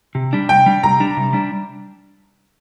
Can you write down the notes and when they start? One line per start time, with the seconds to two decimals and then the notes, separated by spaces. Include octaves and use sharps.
0.15 C3
0.33 G3 D4
0.49 C3 G5
0.66 G3 D4
0.83 C3 A#5
1.00 G3 D4
1.17 C3
1.33 G3 D4